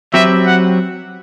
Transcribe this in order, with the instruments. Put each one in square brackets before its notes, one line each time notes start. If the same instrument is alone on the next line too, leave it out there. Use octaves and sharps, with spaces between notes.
[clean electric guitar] F#3 C4 G4 B4 [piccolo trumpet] E5
[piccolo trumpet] F#5